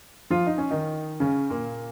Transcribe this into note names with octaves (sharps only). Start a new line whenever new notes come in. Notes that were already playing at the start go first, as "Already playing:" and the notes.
F3 F4
D#4
C#4
D#3 D#4
C#3 C#4
A#2 A#3